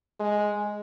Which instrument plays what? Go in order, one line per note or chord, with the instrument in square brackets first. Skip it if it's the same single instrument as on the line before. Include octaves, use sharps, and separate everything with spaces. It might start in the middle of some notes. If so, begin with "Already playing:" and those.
[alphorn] G#3